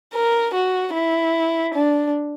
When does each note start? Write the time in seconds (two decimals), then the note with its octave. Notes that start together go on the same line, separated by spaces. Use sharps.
0.14 A#4
0.54 F#4
0.95 E4
1.74 D4